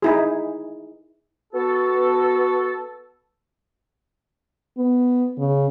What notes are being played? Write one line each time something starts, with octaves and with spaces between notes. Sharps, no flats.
D#4 E4 G#4
B3 F#4 A4
B3
C#3